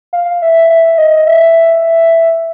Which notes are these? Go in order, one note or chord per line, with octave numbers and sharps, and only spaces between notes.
F5
E5
E5
D#5
E5